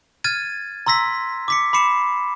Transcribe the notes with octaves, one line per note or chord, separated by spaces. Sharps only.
F6 G#6 A6 D#7
A#5 C6 E6 A#6 B6
D6 B6 C#7
B5 D6 C7 C#7 E7